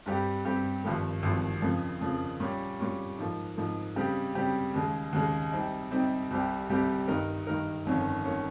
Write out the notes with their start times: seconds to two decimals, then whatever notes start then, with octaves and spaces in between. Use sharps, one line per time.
0.06 G2 G3 C4 G4
0.45 G2 G3 C4 G4
0.84 G#1 G2 F3 A#3
1.23 G#1 G2 F3 A#3
1.62 F2 C#3 F3 A#3
2.01 F2 C#3 F3 A#3
2.40 A#2 G3 C#4
2.79 A#2 G3 C#4
3.18 G#2 F3 A#3
3.57 G#2 F3 A#3
3.96 C#3 G3 C4 G4
4.35 C#3 G3 C4 G4
4.74 D#2 C#3 G#3
5.13 D#2 C#3 G#3
5.52 C3 G3 C4 D#4
5.91 C3 G3 C4 D#4
6.30 C2 C3 G3 C4 G4
6.69 C2 C3 G3 C4 G4
7.08 G2 D#3 A#3 D#4 A#4
7.47 G2 D#3 A#3 D#4 A#4
7.86 G1 F2 D#3 A#3 C#4
8.25 D#3 A#3 C#4